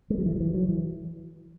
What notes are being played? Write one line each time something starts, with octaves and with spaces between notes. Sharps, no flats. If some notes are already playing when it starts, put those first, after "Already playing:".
G#3
F#3
E3
F#3
E3
F#3
E3